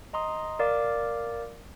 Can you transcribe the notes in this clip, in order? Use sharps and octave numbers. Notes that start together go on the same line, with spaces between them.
D#5 A#5 C6 D#6
A#4 D5 F5 D6